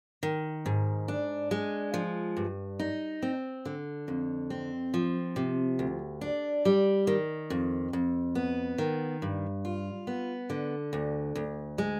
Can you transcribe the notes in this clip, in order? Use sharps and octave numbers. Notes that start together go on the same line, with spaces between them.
D#3
G#2
D4
G#3
F3
G2
D#4
C4
D3
F2
C4
F3
C3
D2
D4
G3
D#3
F2
F2
B3
D#3
G2
F4
B3
D3
D2
D2
G#3